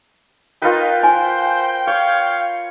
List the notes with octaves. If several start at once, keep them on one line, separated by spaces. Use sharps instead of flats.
D#4 F4 A#4 B4 G5
C5 G#5
C#5 F5